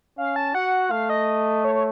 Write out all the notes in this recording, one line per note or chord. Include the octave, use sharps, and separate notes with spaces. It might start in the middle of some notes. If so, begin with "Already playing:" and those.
C#4 F5
A5
F#4 F#5
A3 F5
D#5
C#5
C#5